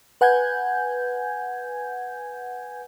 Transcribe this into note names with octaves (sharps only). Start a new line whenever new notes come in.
B4 F#5 G#5 G6 G#6